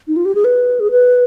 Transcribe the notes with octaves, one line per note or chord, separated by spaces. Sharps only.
D#4
F4
G4
G#4
B4
G#4
B4